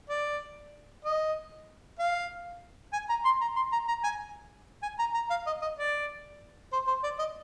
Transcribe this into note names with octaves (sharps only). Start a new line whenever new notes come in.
D5
D#5
F5
G#5
A#5
C6
A#5
C6
A#5
A#5
G#5
G#5
A#5
A#5
F5
D#5
D#5
D5
C5
C5
D5
D#5